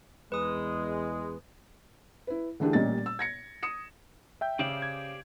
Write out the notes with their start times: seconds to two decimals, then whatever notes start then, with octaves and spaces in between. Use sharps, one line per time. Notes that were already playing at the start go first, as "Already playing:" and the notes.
0.32 E2 G#3 B4 D#6
2.27 E4 B4
2.60 D3 E3 A3 D4 G4 G#4
2.73 A1 A#2 G3 C#4 D#5 A6
3.06 E6
3.19 G#6 A#6 C#7
3.63 D#6 C#7 E7
4.41 E5 G5 G6
4.59 C#3 G4 C5 D5
4.82 G#6